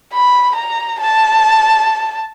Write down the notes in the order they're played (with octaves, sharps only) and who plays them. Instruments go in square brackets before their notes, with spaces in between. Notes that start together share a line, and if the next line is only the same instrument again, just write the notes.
[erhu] B5
A#5
A5